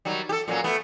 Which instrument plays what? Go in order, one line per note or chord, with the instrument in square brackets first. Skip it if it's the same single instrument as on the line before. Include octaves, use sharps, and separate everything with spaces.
[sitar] D#3 F#3 G3
G4 A4
A#2 F#3 C#4
A3 B3